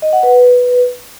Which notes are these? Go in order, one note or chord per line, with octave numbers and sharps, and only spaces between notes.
D#5
F#5
B4